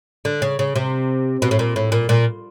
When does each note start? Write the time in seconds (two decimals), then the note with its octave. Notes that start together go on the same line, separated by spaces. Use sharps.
0.25 D3
0.42 C#3
0.59 C#3
0.75 C3
1.42 B2
1.51 A2
1.59 A#2
1.76 A2
1.92 A#2
2.09 A#2